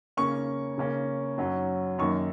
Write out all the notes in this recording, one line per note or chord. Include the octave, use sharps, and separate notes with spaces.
C#3 A#3 C#4 C#6
C#3 A#3 C#4
F#2 F#3 C#4
F#2 D#3 A#3 C#6